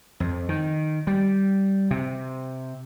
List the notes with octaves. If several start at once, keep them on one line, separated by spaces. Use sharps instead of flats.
F2
D#3
G3
C3